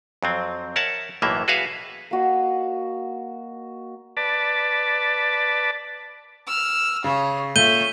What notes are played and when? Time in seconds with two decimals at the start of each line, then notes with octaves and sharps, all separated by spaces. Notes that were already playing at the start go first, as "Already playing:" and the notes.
0.23 F2 F#3 C4
0.76 A#4 C#5 E5 F#5 A5
1.22 B1 A2 E3 A#3 E5
1.48 F#4 G#4 B4 E5 F5
2.11 A#3 F#4 D#5
4.17 B4 D5 A5
6.47 E6 F6
7.04 C#3 G#4 C#5
7.56 A#2 A3 C#5 E5 G6 D#7 G7